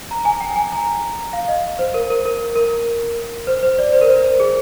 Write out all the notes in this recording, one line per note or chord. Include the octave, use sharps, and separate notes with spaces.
A#5
G#5
G5
G#5
A#5
F5
D#5
C5
A#4
A#4
A#4
A#4
C5
C5
D5
C5
A#4
C5
G#4